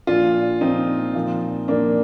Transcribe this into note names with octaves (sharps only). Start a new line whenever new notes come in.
A#2 F3 D4 F4
A#2 F3 C4 D#4
A#2 F3
A#2 F3 A#3 D4